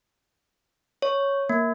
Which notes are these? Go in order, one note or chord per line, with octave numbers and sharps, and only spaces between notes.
C#5
A#3